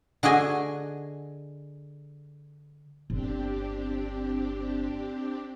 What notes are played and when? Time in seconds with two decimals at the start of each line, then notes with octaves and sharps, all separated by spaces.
0.23 D3 F#4 G#4 D#5 G#5
3.10 G1 C4 D4 G4